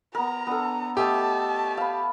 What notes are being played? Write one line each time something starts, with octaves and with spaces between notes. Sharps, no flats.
B3 A#4 A#5
B3 D4 A4
A3 G4 D#5 A5
F5 B5